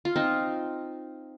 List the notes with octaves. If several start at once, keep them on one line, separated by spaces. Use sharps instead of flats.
F4
C4 D#4